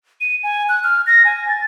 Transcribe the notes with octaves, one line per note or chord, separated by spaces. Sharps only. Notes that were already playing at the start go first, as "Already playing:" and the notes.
D#7
G#5
F#6
F6
A#6
G#5
A6